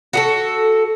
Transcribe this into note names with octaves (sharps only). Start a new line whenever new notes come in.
F#4 G#4 A4